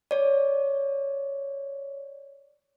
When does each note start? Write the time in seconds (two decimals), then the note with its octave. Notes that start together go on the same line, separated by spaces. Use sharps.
0.11 C#5 D5